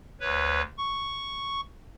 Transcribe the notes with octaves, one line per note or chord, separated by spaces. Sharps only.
D2 B4 C#5
C#6